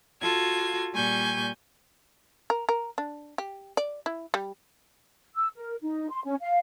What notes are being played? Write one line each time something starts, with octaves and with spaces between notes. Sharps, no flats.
F4 F#4 A4 G#6
A#2 G3 G#5 C#6 G6
A#4
A#4
D4
G4
D5
E4
G3
E6
A#4
D#4
C6
C#4
F5